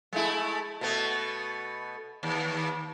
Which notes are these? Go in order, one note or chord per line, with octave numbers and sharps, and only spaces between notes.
G#3 A3 E4
B2 A3 B3
D#2